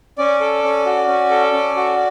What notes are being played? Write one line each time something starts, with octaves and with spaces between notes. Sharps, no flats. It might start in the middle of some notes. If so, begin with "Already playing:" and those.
C#4 D5
A4
C#4
F#4
C#4
A4
C#4
F#4